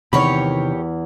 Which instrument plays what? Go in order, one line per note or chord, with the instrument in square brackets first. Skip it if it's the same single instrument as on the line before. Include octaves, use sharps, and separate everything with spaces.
[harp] E2 [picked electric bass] C3 D#3 [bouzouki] G4 A#4 C#5 [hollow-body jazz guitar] B5